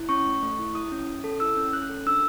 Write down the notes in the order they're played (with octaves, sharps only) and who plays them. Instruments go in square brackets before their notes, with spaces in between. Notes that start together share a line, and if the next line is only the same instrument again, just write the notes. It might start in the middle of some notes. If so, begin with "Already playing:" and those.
Already playing: [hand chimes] E4
C#4 C#6
A3
A3
E4
E4 D#6
C#4
C#4
A4
E4 E6
C#4
C#4 F#6
A4
D4 E6